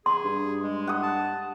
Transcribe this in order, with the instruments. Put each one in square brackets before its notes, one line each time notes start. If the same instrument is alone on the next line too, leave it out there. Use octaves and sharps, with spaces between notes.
[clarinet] G#4 [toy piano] C6
[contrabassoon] G2
[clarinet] G#3
[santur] F#5 D#6
[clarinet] A5